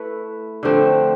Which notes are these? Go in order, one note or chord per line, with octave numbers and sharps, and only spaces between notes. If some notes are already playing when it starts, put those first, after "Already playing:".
Already playing: A3 E4 B4
D3 F3 A3 C4